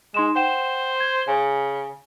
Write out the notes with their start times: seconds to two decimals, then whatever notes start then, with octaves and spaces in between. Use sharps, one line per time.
0.14 G#3 D#4 C6 E7
0.36 C5 F#5 G5 E7
1.00 G#6
1.28 C#3 G#5